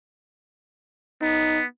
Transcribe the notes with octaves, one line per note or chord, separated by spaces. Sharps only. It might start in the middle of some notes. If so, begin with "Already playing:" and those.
B3 D#4